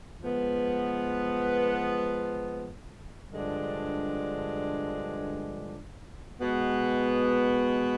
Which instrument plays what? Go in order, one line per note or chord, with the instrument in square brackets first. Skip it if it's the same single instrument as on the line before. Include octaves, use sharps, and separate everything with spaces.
[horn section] F3 G#3 B3
G2 D3 F3 G#3 D4
B2 G#3 B3